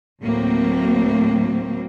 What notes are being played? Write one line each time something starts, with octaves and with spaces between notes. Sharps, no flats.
D2 A2 F#3 A#3 C4